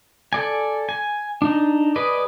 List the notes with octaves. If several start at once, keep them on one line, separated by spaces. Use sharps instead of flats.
A4 D5 G#5
G#5
D4 D#4
G#4 B4 D5 D#5